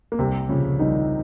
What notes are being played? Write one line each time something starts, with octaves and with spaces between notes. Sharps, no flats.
A#3
C2 C3 C4
A#2 C#3 F3 C#4
C2 D#3 D#4